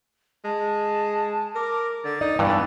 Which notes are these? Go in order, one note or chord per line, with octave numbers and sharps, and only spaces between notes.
G#3 A5
A#4 D6
D3 A6
D#4 D5
G2 E3 B3